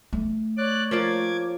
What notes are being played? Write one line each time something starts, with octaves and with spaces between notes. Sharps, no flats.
A3
C#5 D5 F#6
F3 A#3 D5 D6 G#6